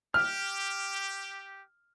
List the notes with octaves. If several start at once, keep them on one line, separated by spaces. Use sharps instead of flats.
G4 F6